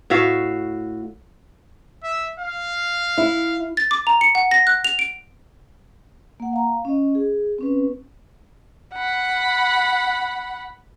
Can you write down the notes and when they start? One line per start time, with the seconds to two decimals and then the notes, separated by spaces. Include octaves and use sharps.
0.10 A2 F#4 E5 F5
2.03 E5
2.39 F5
3.18 E4
3.77 A6
3.91 D6
4.07 A#5
4.21 C#7
4.35 F#5
4.51 A#6
4.67 F#6
4.84 F7
4.99 D7
6.40 A#3 F#5
6.53 F5 A#5
6.85 C#4 D#5
7.15 G#4
7.58 C4 C#4 B4
8.94 F#5 B5